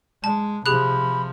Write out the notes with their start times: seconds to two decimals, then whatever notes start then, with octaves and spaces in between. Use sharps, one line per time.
0.24 G#3 A5
0.66 C3 F3 G4 G#4 B5 F#6